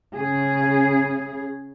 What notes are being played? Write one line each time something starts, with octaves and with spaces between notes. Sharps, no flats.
C#3 G#4